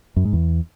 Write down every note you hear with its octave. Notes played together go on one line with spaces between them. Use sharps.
F#2
G#2
E2